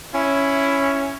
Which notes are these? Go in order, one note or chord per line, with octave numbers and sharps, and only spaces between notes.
C#4 E4